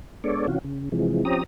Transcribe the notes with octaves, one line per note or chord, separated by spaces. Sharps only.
G#3 B3 D4 A4 C#5 D5
C3 E3 C#4 F4 F#4
C#3
C3 E3 F3 G#3
F3 C4 C#4 G4 A#5 D#6